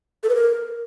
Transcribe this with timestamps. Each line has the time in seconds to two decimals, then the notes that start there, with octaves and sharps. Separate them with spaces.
0.23 A4
0.29 B4
0.35 A#4